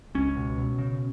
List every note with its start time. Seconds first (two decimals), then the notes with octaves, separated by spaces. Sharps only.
0.15 C#2 C#4
0.36 B2
0.58 B2
0.78 C#3